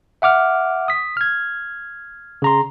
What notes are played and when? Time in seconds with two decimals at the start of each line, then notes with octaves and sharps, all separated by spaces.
0.22 E5 F#5 D6 F6
0.88 D#6 B6
1.17 F6 G#6
2.42 C#3 A#5 C6